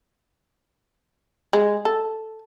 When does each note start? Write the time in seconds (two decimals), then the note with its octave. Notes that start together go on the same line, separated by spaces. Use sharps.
1.53 G#3
1.85 A4